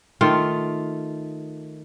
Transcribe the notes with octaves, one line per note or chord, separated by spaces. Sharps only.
D#3 A3 F4